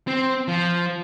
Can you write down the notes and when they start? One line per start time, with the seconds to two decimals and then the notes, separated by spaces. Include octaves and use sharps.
0.08 C4
0.48 F3